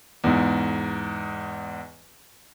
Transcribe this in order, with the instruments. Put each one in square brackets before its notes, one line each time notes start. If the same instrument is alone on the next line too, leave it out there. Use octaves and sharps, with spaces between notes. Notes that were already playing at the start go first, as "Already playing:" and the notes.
[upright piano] E2 G#2